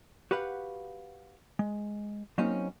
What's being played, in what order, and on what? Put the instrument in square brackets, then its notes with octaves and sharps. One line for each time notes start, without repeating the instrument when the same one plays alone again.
[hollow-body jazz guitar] F#4 G4 B4 F5 F#5
G#3
F#3 A#3 C4 C#4 D#4